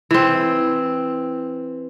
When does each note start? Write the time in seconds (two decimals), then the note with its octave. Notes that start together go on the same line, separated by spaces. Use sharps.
0.11 E3 C4